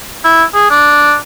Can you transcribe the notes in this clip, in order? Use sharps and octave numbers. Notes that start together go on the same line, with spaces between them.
E4
G#4
D4